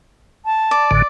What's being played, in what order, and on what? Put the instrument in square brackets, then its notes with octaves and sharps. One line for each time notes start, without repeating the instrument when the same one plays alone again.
[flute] A5
[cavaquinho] D5
[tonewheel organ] G#1 A2 D3